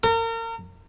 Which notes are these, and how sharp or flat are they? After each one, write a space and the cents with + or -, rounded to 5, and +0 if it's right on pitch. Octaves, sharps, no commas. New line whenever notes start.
A#4 -35